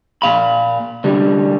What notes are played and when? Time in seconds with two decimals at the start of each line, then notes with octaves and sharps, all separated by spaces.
0.22 A#2 F5 B5
1.04 C2 D3 G3